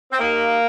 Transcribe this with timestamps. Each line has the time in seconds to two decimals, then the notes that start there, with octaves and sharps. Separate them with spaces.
0.12 C4
0.18 D#2 D#3 A#3